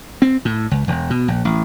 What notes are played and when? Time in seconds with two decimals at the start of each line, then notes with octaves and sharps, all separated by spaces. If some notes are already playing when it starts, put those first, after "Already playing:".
0.22 C4
0.45 A2
0.71 C#2
0.88 E1
1.10 B2
1.28 A#1
1.45 A1